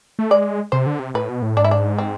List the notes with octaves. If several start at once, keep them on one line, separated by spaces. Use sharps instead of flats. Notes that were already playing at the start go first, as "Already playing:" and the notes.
A3
G#3 D5
C3 C5
D3
C3
A2 B4
B2
A2
G#2 D4
E4
D4
C4